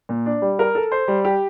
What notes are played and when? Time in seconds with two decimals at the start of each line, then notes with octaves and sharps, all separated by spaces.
0.09 A#2
0.26 D4
0.42 G3
0.59 A#4
0.75 A4
0.92 C5
1.08 G3
1.25 G4